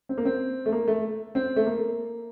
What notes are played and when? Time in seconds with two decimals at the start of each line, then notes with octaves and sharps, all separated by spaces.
0.09 C4
0.17 A#3
0.25 C4
0.66 A3
0.72 A#3
0.88 A3
1.35 C4
1.56 A3
1.66 A#3